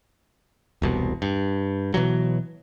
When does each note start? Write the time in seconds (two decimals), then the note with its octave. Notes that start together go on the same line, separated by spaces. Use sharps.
0.82 E1 C2 B2
1.22 G2
1.94 B2 E3 F#3